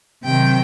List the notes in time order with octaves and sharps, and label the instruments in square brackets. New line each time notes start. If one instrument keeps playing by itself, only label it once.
[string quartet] C3 D#3 F#3 G5